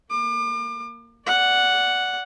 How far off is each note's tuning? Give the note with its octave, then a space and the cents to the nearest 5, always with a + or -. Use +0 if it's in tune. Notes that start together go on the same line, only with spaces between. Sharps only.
A#3 -10 D6 +35
D5 -20 F#5 +0